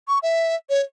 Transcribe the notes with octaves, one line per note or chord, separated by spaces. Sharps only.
C#6
E5
C#5